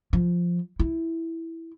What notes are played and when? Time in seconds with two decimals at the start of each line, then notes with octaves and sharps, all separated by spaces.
0.13 F3
0.79 E4